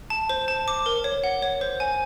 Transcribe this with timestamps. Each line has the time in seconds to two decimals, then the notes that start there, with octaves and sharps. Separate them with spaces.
0.10 A5
0.29 C5
0.48 A5
0.68 D6
0.86 A#4
1.04 C#5
1.24 F#5
1.42 C#5
1.61 C5
1.80 G#5